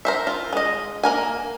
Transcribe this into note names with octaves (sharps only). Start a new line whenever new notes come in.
A#4 C5 E5
F4
G#3 D#5
A#3 A#4 G#5